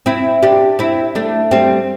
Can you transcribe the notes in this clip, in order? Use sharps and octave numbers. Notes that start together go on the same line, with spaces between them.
C4 E4
D4 G4
C4 E4
A3 D4
G3 C4